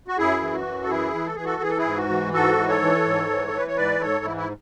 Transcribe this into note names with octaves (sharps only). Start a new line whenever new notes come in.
F#4
F#2 E4 G#4
E3
F#4
F#2
A4
E3 E4 G#4
E3
A4
E3 G#4
F#4 A4
E3 G#4
A4
E4 G#4
G#2
F#4
E3
G#2 F#4 A4
E3
A4 C#5
E3
G#2
E3
A4
E3 B4
C#5
G#2 B4 D5
G#2 A4 C#5
E3 E4
E4